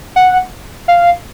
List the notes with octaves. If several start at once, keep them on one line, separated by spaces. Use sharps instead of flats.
F#5
F5